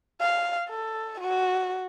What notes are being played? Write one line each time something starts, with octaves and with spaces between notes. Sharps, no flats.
F5
A4
F#4